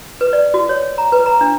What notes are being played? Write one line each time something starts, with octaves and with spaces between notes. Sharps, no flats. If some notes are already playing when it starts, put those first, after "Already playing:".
B4
D5
F#4
C#5
A#5
B4
A#5
D4